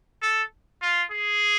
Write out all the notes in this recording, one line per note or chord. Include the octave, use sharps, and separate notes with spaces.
A4
F4
G#4